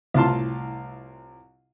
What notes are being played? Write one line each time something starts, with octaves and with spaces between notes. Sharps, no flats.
C2 A2 F4 F5 A5 C6